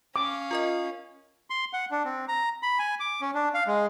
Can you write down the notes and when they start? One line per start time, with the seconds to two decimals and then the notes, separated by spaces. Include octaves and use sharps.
0.16 C#4 F5 D6
0.51 F4 A#4 D#5
1.50 C6
1.73 F#5
1.91 D4
2.04 C4
2.28 A#5
2.63 B5
2.79 G#5
3.00 D6
3.21 C#4
3.34 D4
3.54 F5
3.67 G#3